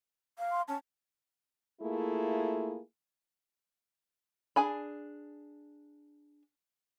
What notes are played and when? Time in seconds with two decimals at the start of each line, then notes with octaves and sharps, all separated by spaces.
0.38 F5
0.52 C6
0.68 C#4 A5
1.82 A3 A#3 E4 F4 G#4
4.56 D4 G#4 G#5 B5